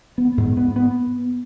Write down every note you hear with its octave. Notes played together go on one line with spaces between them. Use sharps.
B3
G#2
B3
B3